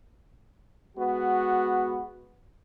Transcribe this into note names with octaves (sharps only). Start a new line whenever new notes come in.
G#3 B3 F#4